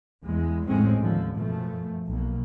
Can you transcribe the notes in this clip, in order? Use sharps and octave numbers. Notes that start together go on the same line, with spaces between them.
E2 G#3
G#1 F2 A2 G#3 C4 C#4
D#2 D3 F3
F#2 B2 F3 A3
B1 B2 A#3